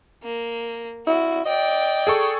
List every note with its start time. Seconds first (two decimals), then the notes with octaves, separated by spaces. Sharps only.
0.23 A#3
1.07 E4 F#4
1.46 D5 D#5 G5
2.07 G#4 A4 C#6